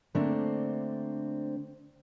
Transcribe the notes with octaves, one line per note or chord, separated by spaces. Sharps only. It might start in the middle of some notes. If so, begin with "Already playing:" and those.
D3 A3 A#3 C4 D4 C5